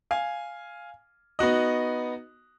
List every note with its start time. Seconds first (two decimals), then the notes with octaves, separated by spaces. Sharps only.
0.11 F5 G#5
1.39 B3 D#4 F#4 D#5